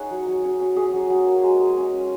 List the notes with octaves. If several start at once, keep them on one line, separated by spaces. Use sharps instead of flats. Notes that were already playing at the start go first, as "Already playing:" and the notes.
Already playing: C#4 D#4 G#4 C#5 F#5
F#3
F#3
C#4
C#4
C#4 G#4
F#3
F#3
A#3
G#3
G#3
C#4
C#4